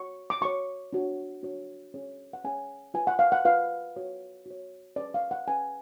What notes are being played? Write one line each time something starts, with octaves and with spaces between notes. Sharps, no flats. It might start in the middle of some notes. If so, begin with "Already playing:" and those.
Already playing: F#4 C#5 C#6
D6
F#4 C#5 C#6
D4 F#4 C#5
D4 F#4 C#5
C#4 G#4 C#5
F#5
C#4 G#4 C#5 G#5
F4 B4 G#5
F#5
F5
F#5
F4 B4 F5
F#4 C#5
F#4 C#5
C#4 G#4 B4 D5
F5
F#5
C#4 G#4 B4 G#5